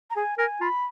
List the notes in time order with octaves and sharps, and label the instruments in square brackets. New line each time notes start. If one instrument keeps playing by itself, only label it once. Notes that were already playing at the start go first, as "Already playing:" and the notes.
[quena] A#5
[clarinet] G#4 [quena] G#5
[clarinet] A#4 [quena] G#5
[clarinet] F4 [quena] B5